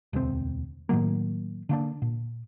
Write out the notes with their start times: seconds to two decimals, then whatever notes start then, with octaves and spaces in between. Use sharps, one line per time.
0.13 E1 D2 G#3 C4
0.89 A2 D#3 F#3 A#3
1.69 D3 A#3 D4
2.02 A#2